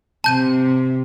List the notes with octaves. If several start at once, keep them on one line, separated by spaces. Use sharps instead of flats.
C3 A5 G6 D#7